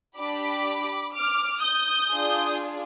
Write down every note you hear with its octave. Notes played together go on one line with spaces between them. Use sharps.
D4 G4 B5 D6
D6 F6
D#6 G6
D4 F4 G#4